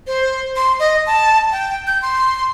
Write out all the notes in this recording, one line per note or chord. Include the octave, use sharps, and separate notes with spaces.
C5
C6
D#5
A5
G5
G6
C6